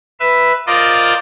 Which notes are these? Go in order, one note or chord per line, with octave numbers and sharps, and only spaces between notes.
B4 E5
F4 A#4 C5 D5 D#5